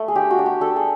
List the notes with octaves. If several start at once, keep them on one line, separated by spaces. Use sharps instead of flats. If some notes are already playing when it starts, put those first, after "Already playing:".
Already playing: A3
G#4
D4 G4
F#4
D4
G4
D4 A4
G#4